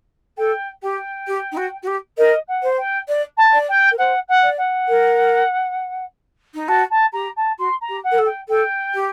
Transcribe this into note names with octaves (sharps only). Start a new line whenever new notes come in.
A4 G5
G4 G5
G4
D#4
F#4
F#4
G4
A#4 D#5
F#5
C5
G5
D5
A5
D5
G5
A#4
C5 F#5
F#5
D5
F#5
A#4
D#4
F#4 A5
A5
G4 A#5
A5
F#4 C6
A#5
G4
F#5
A#4
A4
G5
A4 G5
G4